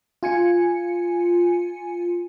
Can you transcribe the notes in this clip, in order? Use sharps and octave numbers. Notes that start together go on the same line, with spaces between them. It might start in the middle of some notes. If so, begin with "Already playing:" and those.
F4 G#5 C#7